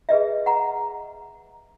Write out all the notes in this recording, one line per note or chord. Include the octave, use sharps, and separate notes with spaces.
G#4 B4 D#5 E5
F#5 A#5